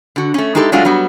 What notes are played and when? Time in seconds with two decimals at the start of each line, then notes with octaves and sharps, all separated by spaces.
0.16 D3 F#4
0.34 A3 C#4
0.55 G#3 D#4 E4 G4 A4
0.72 F#3 G#3 A3 D4 F4 F#4
0.85 F#3 G3 B3 F#4